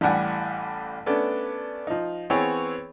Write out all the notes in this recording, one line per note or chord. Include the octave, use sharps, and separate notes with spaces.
A1 A2 G3 F#5 G#5
A3 B3 C#4 D4
F3 D#4
E3 B3 C4 G#4 C#5